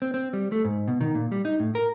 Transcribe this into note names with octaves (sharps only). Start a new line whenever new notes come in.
C4
C4
G3
A3
G#2
B2
D#3
A#2
G3
D#4
A2
A#4